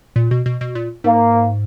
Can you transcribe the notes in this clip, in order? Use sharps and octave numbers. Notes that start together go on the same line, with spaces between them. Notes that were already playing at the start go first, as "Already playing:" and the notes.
A#2
B2
B2
B2
A#2
G#2 A#3